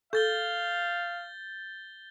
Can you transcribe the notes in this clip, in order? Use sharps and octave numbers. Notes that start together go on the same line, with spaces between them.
A4 F5 G6 A6 G7